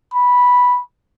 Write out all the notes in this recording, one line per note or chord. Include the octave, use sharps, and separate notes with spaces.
B5